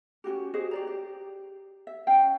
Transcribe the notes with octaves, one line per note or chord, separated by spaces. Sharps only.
C#4 D#4 F#4 G4
F#4 G#4 C5 D#5
G4 D5 A#5
G4
E5
C#4 F5 G5